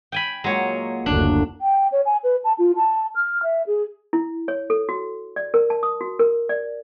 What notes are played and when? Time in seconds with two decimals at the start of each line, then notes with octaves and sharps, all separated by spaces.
0.12 G5 G#5 B5
0.44 A#2 F#3 G#3 C#5
1.06 F#1 D2 D4
1.61 G5
1.92 C#5
2.05 G#5
2.24 B4
2.44 A5
2.59 F4
2.76 A5
3.16 F6
3.43 E5
3.67 G#4
4.13 E4
4.48 C#5
4.70 A4
4.89 F#4
5.36 D5
5.54 A#4
5.70 A5
5.83 D#6
6.01 F#4
6.19 A#4
6.49 D5